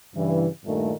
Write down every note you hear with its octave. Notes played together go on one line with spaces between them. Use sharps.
G2 C#3 E3
G2 A#2 D#3 A3